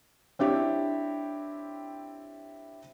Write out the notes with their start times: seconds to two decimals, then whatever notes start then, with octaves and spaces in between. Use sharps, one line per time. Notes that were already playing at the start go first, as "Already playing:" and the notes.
0.39 C4 D4 E4 G4 C#5